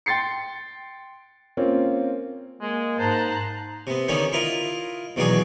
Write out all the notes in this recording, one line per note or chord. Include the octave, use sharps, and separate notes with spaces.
G5 C6 A6 C7 C#7
A#3 C4 C#4 F4
G#3 A#3
G#2 C5 A5 A#5 F#6
C3 B3
D3 D#3 B3 C#4 D#4
E4 F4 A#4 D#5
E2 B2 D#3 F#3 D4 G#4